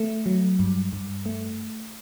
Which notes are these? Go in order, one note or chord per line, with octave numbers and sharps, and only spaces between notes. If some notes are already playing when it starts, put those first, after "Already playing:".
Already playing: A3
F#3
G2
G2
A3